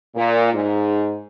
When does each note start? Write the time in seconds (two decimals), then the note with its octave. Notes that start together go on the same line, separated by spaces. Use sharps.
0.15 A#2
0.54 G#2